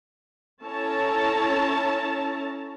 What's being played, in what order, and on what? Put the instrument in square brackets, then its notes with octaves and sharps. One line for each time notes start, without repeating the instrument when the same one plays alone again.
[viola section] C#4 E4 A4 C#5 A5 A#5